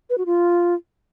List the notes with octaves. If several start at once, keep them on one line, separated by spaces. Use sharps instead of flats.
B4
F#4
F4